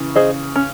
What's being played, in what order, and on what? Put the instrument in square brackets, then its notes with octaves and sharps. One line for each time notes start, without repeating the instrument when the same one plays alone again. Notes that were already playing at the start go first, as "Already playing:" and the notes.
Already playing: [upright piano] C#3 E3
[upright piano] C#3 [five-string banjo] G#4 C5 D#5
[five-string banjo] C#4